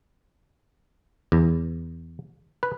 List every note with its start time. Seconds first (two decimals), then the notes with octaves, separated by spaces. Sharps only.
1.32 E2
2.63 B4